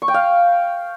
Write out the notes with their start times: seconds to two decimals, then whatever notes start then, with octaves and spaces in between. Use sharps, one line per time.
0.02 C#6
0.08 G5
0.14 F5